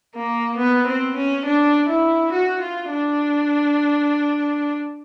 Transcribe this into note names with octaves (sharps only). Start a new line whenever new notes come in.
A#3
B3
C4
C#4
D4
E4
F#4
F4
D4